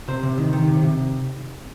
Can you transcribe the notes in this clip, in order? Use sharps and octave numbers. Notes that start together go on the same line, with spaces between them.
C3 C5
C3
D#3
D#3
C3
C3